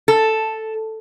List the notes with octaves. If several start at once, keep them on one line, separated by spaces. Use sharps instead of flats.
A4